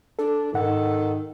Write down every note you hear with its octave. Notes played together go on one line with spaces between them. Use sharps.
D4 A4
G#2 D#3 A4 F#5